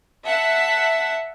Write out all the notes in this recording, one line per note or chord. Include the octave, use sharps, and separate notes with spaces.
E5 F#5 A5